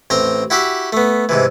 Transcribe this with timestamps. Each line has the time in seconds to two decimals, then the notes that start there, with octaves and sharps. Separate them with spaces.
0.10 A1 C4 A#5 C6
0.50 E4 F#4 G4 E5
0.93 A3 B3
1.29 G#2 C3 E3